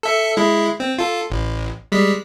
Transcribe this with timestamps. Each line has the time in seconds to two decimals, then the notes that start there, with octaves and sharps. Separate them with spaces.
0.03 A4 E5 C#7
0.37 G#3 E4
0.80 C4
0.99 F4 A4
1.30 A1
1.92 G3 G#3 B6